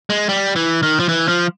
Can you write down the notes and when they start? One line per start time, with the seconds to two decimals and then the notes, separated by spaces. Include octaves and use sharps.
0.10 G#3
0.29 G3
0.56 E3
0.83 D#3
1.00 F3
1.09 E3
1.28 F3